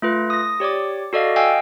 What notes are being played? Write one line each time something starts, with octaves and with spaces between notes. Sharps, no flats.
A3 F4 B4
D#6 A#6
G4 C#5 D5 D6
F#4 A4 D5 D#5 F5
D#5 F5 G5 G#5 E6